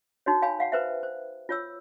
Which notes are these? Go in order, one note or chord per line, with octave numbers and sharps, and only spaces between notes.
D#4 F#4 C#5
C#5 F5 G#5 B5
C#5 F5 F#5
B4 C5 E5
C5
F4 C#5 E6